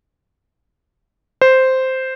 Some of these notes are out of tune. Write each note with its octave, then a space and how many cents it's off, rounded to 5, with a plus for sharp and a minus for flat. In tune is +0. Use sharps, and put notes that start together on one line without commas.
C5 -5